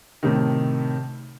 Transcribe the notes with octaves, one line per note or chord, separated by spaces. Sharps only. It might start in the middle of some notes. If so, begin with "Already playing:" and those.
A2 C3 D#3